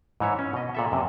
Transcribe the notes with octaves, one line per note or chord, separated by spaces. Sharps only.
G#2 E3 C#5 E5
C#4
B2 D#5
A#2 A4 E5
F#2 C3